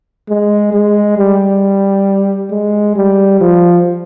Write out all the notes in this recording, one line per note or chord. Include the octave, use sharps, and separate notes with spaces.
G#3
G#3
G3
G#3
G3
F3